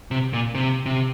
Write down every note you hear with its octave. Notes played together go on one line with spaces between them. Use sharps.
C3
A#2
C3
C3